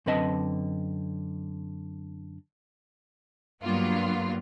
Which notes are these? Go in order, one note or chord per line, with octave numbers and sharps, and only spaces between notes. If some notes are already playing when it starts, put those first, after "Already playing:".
F#2 D3 C4 B4 D#5 A5
G2 F#3 A#3 B3 F4